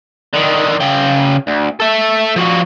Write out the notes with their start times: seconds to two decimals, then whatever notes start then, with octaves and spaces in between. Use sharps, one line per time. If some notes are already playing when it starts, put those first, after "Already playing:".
0.34 D3 D#3
0.80 C#3 G5
1.47 D2
1.80 A4 E5
2.36 F3 F#4